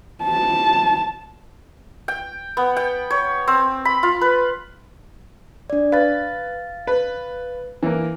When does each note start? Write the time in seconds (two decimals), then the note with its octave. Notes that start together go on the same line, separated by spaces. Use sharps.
0.24 A5
2.08 G5
2.57 B3
2.77 G5
3.11 C#5
3.48 C4
3.85 B5
4.03 F4
4.21 B4
5.70 D4 D5
5.92 B4 F5 A6
6.87 B4
7.83 E3 A#3